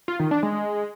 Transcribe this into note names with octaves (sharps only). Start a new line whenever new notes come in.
F4
D#3
D4
G#3